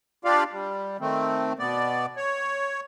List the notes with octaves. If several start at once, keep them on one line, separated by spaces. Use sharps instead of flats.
D4 F4 G4 D5 F5
G3
D#3 A3 C4
B2 B3 D5
C#5